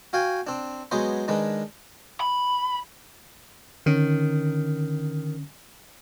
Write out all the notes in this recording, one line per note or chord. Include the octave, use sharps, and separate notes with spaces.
F#4 F5 G5 G#5
C4 D4
F#3 G#3 B3 B4 C5
D#3 G#3 D4 B4
B5
D3 D#3 C#4